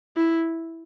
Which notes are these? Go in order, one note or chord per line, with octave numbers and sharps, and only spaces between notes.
E4